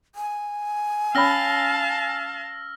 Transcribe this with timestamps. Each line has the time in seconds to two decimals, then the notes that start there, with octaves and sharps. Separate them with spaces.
0.15 G#5
1.15 C#4 C#5 F5 A5 B5 E6 F6 A#6